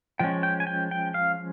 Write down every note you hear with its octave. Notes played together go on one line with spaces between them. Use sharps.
F3 G#3 C#4 G5
G5
G#5
G5
G5
F5